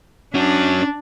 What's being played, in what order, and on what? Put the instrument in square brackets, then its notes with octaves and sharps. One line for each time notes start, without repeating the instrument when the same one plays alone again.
[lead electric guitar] C#4 F#4 [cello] D4